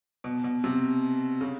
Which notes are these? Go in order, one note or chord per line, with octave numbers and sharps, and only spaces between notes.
B2
B2
C3
C#3